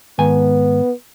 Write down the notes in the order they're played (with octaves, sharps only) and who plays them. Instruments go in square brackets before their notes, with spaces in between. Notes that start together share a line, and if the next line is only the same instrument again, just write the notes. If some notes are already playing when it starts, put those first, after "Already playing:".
[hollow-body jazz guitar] G#2 D#3 G#5 [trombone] B3